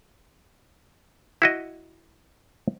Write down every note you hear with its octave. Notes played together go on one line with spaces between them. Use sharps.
E4 F#4 D#5